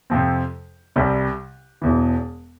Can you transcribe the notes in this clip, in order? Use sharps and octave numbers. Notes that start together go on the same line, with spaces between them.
F2 C3 F3 C4
C2 C3 G3
E1 E2 E3